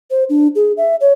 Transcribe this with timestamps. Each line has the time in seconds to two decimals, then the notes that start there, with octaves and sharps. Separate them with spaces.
0.11 C5
0.29 D4
0.56 G#4
0.77 E5
1.01 C#5